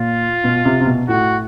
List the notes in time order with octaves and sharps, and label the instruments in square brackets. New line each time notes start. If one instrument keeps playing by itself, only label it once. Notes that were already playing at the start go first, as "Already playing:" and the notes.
Already playing: [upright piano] A#2 [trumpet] F4
[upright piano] B2
C3
C3
B2
[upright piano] A2 [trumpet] F#4